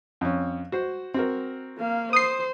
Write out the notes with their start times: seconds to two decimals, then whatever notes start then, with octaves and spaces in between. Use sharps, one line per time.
0.21 F2 C#4
0.72 F#4 C5
1.14 C4 F#4 A#4
1.78 A#3 F5
2.13 C5 D#6 C7